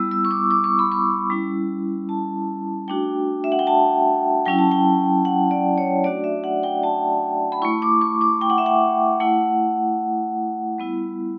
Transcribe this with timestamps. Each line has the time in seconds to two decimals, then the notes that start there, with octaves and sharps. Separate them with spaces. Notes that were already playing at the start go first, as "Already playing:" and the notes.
Already playing: G3 B3 E4 E6
0.11 E6
0.25 C#6
0.31 D6
0.51 D6
0.64 C#6
0.79 B5
0.92 C#6
1.30 G3 C#4 E4
2.09 A5
2.88 A3 D4 F#4 G5
3.44 E5
3.52 F#5
3.59 G5
3.67 A5
4.45 F#3 C#4 E4 G5
4.59 A5
4.71 G5
5.25 F#5
5.51 D5
5.78 C#5
6.04 A3 D4 F#4 D5
6.24 E5
6.44 F#5
6.63 G5
6.83 A5
7.52 B5
7.62 E4 C#6
7.65 A3
7.82 D6
8.01 C#6
8.21 D6
8.41 G5
8.50 F#5
8.58 E5
8.66 F#5
9.20 A3 E4 F#5
10.78 G3 B3 E4